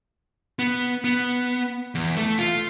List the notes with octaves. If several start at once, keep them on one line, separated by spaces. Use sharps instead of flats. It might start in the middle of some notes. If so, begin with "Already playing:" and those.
B3
B3
E2
A3
F4